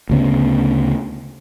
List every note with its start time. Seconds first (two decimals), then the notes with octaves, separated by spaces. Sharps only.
0.10 D2 C#3 B3